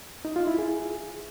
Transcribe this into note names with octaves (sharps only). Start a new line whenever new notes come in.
D#4
F4
E4
G#4